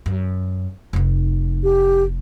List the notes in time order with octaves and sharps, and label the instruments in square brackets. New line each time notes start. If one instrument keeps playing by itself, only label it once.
[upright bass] F#2
F1 D#4
[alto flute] G4